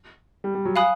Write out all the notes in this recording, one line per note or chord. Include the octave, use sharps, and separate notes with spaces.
G3
G3
F#3
F5 G#5 B5 D#6 F#6